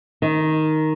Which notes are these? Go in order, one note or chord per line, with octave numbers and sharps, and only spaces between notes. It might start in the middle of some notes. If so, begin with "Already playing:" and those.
D#3